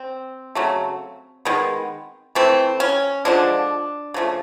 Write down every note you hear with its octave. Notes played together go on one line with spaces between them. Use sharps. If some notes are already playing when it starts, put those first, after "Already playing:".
Already playing: C4
C#3 F#3 A3
D#3 G#3 B3
E3 A3 C4
C#4
D3 F3 G#3 D4
C#3 F3 A3